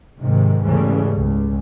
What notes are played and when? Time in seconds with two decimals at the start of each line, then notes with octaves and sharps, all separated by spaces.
0.18 G#2 C3 D#3
0.63 E2 G#2 C#3 E3 G3 A3
1.15 C#2